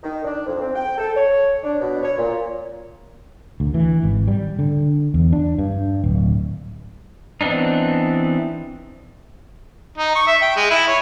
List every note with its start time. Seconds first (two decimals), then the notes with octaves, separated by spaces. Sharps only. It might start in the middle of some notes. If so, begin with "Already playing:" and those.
0.03 D#3
0.25 D4
0.46 F2
0.61 C4
0.75 G5
0.98 A4
1.16 C#5
1.64 D4
1.81 B2
2.02 C#5
2.18 A#2
3.60 D2
3.74 E3
4.03 G#1
4.28 G3
4.59 D3
5.14 E2
5.32 D4
5.58 G2
6.04 D1
7.41 E3 B3 C4 D4 D#4
9.98 D#4
10.15 C#6
10.27 E5
10.42 G5
10.56 G#3
10.70 E4
10.87 C#5